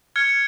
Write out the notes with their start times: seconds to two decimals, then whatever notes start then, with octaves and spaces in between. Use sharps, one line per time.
0.16 F6 G#6 C#7